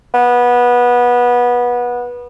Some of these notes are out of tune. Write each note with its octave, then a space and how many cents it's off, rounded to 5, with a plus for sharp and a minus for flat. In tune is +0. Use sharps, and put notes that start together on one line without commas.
B3 -20